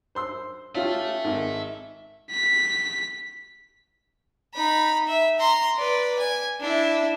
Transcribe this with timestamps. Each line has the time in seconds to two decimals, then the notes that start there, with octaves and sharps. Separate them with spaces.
0.15 C5 C6 E6
0.75 C#4 F4 G4 E5 A5
1.24 G#1
2.31 B6
4.55 D#4 B5
5.07 E5
5.39 A#5 C6
5.77 B4 D5
6.19 G#5
6.61 D4 E4